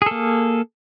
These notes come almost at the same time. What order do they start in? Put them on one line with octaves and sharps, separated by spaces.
G#4 A4 A#3